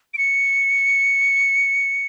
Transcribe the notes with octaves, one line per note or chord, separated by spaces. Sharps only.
D7
C#7